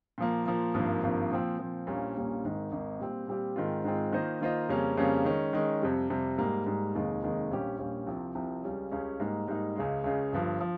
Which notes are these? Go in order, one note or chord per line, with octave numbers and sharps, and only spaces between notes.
A#2 F3 A#3
A#2 F3 A#3
G#1 G2 F3 A#3
G#1 G2 F3 A#3
A#2 F3 C4
A#2 F3 C4
A#1 A#2 G3 A#3 C#4
A#1 A#2 G3 A#3 C#4
G#1 G#2 D#3
G#1 G#2 D#3
A#2 G3 C4 G4
A#2 G3 C4 G4
G#2 D#3 G#3 C4 F4
G#2 D#3 G#3 C4 F4
D#3 A#3 F4 C5 D#5
D#3 A#3 F4 C5 D#5
F2 C#3 G3 A#3 C#4
F2 C#3 G3 A#3 C#4
D#3 G#3 C#4
D#3 G#3 C#4
F2 C3 G3
F2 C3 G3
G#2 G3 A#3
G#2 G3 A#3
F1 D#2 D#3 G#3
F1 D#2 D#3 G#3
A#1 A#2 G3 C#4 G4
A#1 A#2 G3 C#4 G4
C2 C3 F3 C4
C2 C3 F3 C4
C#2 C#3 G3 C#4
C#2 C#3 G3 C#4
G#2 G3 A#3 D#4
G#2 G3 A#3 D#4
C#2 C#3 G#3
C#2 C#3 G#3
G1 G2 F3
F3